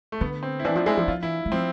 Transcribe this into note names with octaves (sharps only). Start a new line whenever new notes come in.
A3
D3 B3
C4
E4
E3 D4
F3
G#3 E4
F3
F3 F4
E3 E4
G#3
F3 C4